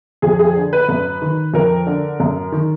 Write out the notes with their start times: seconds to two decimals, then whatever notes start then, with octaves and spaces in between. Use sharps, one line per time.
0.22 F2 G#4
0.39 G#4
0.56 D3
0.73 B4
0.89 F#2
1.22 D#3
1.54 F2 A#4
1.87 D3
2.20 F#2
2.52 D#3